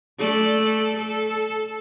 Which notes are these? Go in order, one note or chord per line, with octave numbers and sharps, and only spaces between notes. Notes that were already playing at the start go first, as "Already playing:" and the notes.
A3 A4 D5
A4